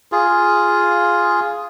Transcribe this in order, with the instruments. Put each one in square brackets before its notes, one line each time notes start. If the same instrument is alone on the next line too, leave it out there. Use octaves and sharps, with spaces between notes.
[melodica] F4 G#4